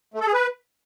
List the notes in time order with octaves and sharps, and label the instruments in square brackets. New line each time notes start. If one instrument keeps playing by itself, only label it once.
[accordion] A3
A4
G#4
B4